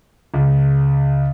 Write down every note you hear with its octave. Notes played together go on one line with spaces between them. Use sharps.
C#2